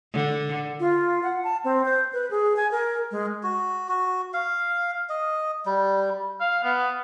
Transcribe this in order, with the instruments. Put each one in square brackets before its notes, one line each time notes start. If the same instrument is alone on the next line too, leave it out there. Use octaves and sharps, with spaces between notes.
[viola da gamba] D3
[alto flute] F4
F#5
A5
C4
C5
B4
G#4
G#5
A#4
G#3
[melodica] F#4
F#4
F5
D#5
G3
[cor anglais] F5
B3